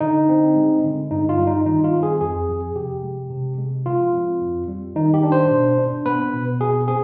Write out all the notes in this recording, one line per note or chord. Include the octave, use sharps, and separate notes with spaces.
D3 D#4
C4
G#3
D3
G2 D#4
F4
G3
D#4
D#3 D#4
F4
C4
G#4
F2 G#4
F3
C3 G4
G#3
C3
G#3
F3 F4
C4
F2
G3
D#3 D#4
G4
D4
C5
B2
D4
B3 B4
B2
B2 G#4
C4 G#4